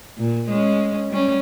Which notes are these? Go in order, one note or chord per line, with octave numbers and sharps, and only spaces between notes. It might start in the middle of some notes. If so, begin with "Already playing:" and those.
A#2
G#3 C#4
G3 C#4